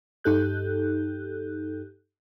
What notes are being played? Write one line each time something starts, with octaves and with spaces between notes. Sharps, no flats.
G2 D#4 G4 A4 F#6 G6